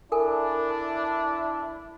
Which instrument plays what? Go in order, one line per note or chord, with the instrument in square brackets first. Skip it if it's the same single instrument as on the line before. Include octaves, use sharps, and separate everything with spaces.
[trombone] D4 [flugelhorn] E4 [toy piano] A4 A#4 G#5